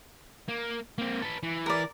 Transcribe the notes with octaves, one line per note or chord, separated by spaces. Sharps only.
A#3
A#3 C4
A4 B4
E3
A#4 D5